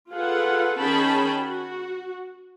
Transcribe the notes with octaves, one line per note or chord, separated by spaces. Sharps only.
F4 G#4 A4 B4 F#5
D#3 C#4 G#4 G5 A5 B5
F#4